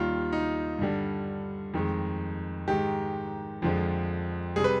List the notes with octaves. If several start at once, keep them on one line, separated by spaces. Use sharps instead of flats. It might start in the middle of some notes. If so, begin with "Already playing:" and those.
Already playing: D#2 D#3 G3 F4
D#4
G2 D3 G3
F2 D#3 G#3
G#2 D#3 G#3 G4
F2 D3 F3 G#3
C3 G3 G#4
B4